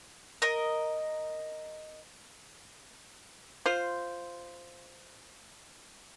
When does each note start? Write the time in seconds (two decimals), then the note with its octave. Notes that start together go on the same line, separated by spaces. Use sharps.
0.42 A#4 D#5
3.66 F4 C5